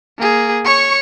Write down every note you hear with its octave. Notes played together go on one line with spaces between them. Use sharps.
A#3 G#4
C#5 C#6